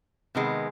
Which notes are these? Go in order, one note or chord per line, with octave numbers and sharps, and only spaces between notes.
C3 D#3 G#3 B3